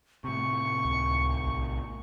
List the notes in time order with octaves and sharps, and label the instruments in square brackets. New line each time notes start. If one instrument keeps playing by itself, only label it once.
[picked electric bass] A2 C3 [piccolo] C#6
[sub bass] C#2
B1